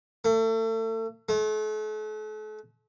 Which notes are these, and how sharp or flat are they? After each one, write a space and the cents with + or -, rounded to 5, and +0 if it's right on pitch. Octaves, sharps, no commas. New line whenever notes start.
A3 +35
A3 -40